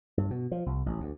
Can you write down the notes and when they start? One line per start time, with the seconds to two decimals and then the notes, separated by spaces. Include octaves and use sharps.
0.17 G2
0.31 B2
0.52 F3
0.66 C2
0.86 A1
1.00 D2